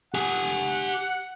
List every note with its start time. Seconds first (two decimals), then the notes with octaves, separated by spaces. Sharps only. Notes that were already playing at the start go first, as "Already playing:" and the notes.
0.14 G4 F#5 G#5